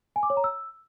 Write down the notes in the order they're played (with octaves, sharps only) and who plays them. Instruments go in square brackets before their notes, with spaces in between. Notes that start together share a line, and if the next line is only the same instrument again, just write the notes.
[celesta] G#5
D6
C#5
A#5
E6